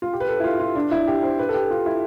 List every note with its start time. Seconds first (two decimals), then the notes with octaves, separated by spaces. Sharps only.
0.02 F4
0.13 G4
0.20 B4
0.29 A4
0.40 E4
0.44 F4
0.60 F4
0.75 D4
0.91 E4
1.07 G4
1.23 C5
1.39 B4
1.49 A4
1.54 G4
1.71 F4
1.86 E4